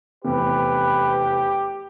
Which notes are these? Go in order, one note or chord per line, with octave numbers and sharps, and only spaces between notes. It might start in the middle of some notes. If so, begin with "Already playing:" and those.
F1 E2 G4 B4